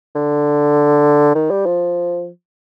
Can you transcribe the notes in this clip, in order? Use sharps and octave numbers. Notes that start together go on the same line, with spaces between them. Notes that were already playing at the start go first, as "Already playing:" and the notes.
D3
D#3
G3
F3